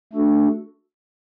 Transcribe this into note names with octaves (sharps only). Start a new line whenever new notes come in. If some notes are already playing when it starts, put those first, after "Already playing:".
A3 D4 F#4 A4